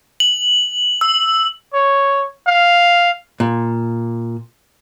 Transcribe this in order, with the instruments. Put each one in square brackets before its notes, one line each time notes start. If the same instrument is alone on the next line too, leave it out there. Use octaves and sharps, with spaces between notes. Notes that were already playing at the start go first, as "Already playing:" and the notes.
[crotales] F#7
E6
[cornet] C#5
F5
[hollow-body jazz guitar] A#2